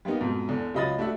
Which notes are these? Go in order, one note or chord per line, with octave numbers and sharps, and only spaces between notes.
G3 A#3 B3 D#4
F2 G#2 B2
E2 D3
C#2 F#3 D#5 B5 D#6 A6
A3 D4 F#4 E5